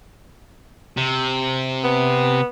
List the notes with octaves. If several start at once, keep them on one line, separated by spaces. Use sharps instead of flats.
C3
B3